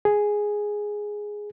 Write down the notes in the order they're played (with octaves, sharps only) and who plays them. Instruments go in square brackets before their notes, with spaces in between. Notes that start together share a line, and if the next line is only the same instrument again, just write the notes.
[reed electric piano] G#4